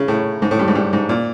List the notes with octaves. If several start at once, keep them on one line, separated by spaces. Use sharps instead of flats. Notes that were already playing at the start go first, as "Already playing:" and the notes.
Already playing: C#3
A2
G#2
A2
G2
G#2
G2
G#2
A#2